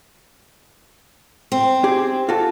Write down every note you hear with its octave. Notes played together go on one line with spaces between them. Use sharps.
C4
G4 G#4
F4 F#4 A4